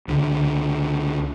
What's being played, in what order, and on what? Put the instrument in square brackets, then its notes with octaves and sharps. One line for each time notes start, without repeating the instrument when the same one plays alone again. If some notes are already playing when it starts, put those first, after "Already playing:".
[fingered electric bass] C#2 D3